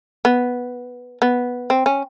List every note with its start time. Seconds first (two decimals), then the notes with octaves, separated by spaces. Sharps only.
0.25 B3
1.22 B3
1.70 C4
1.86 C#4